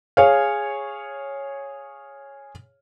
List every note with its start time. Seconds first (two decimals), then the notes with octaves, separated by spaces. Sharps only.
0.17 G#4 C#5 F5